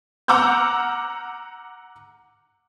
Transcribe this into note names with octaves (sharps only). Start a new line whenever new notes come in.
F#5 A#5 D6 E6 F6 G6